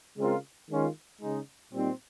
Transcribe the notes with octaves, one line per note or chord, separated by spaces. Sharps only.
C#3 G#3 C4 F4 A#4
D#3 G#3 C#4 F4
C#3 G#3 D#4
A#2 G3 C4 D#4